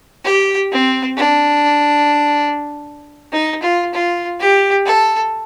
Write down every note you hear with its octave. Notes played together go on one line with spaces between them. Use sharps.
G4
C4
D4
D#4
F4
F4
G4
A4